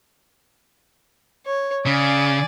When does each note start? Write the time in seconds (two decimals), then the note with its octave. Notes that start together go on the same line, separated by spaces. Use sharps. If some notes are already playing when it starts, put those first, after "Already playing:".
1.46 C#5
1.86 C#3 D5 G#5